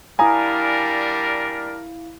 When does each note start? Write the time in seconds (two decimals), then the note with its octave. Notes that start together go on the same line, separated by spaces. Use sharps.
0.19 G3 D4 E4 A#4 F5 G#5 A#5 D#6